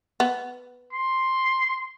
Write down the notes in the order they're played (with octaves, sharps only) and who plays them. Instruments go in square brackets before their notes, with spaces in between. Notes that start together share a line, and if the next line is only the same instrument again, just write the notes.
[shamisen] B3
[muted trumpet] C6